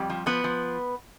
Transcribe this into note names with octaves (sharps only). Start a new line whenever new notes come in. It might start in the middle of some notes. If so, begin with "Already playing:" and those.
Already playing: F2 G3 G4
F3
F3 B3 B4
F3